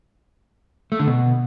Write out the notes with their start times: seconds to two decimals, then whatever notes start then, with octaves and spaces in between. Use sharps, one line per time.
0.92 A3
0.99 D3
1.07 B2